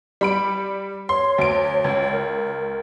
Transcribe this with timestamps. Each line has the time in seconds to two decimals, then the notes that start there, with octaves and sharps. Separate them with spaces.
0.21 G3 B5 D7
1.09 C#5 C6
1.38 D2 D7
1.84 C#2
2.12 A#4